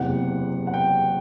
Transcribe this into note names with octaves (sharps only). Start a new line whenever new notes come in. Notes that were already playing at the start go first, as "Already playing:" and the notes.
Already playing: F#1 E2 C3 E3 F#5
F#5
G5